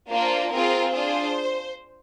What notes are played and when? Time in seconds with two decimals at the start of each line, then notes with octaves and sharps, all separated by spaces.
0.10 A#3 D4 F4 C5
0.51 C4 F4 G#4 A#4
0.92 D4 F4 G#4 C5